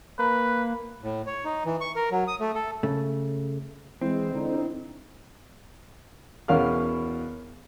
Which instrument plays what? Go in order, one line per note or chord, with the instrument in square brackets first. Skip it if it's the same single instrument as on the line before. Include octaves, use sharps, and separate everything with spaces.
[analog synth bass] A#3 [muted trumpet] B4
[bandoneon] A2
C#5
D#4
E3
C#6
A#4
F#3
D#6
A3
A4
[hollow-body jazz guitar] C#3 A3
[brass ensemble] E3 G#3 [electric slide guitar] C4 [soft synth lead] E4
[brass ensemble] D3 D#4
[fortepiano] E2 B2 C#4 A#4 F5 F6